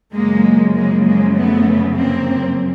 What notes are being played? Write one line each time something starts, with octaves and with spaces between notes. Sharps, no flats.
F#2 C#3 F3 G#3 A#3
G#3 A#3
G#3 A#3
A3 B3
A#3 C4